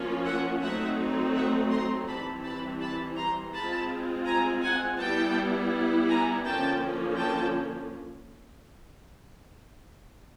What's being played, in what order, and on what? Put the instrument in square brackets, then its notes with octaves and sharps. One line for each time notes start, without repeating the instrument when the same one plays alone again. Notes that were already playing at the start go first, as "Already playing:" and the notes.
Already playing: [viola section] F3 A#3 C#4 F4
E5 F#5
F#3 A3 C4 D#4 E5 F#5
E5 F#5
A#5 C6
E3 G3 C4 A5 B5
A5 B5
A5 B5
A#5 C6
G#3 C4 F4 A5 B5
G#5 A#5
F#5 G#5
G3 B3 E4 G5 A5
G#5 A#5
D3 F3 A#3 C#4 G5 A5
G5 A5